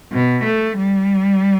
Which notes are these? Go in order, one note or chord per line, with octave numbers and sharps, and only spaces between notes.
B2
A3
G3